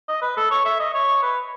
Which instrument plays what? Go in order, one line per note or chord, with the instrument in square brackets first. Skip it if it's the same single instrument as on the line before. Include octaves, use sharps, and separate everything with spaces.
[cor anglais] D#5
B4
A4
C#5
E5
D#5
C#5
B4